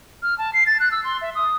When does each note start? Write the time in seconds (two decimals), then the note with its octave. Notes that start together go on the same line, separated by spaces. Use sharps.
0.23 F6
0.38 A5
0.53 C7
0.66 A6
0.80 F#6
0.91 E6
1.04 C6
1.21 E5
1.35 D#6